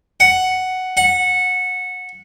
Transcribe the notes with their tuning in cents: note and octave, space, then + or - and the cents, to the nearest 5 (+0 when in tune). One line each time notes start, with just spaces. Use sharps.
F#5 +5
F#5 -15